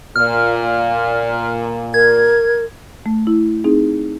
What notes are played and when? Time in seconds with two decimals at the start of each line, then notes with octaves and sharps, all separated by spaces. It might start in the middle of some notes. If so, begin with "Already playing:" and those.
0.16 A#2 F6
1.94 A#4 G#6
3.06 A3
3.27 E4
3.64 C4 D#4 G#4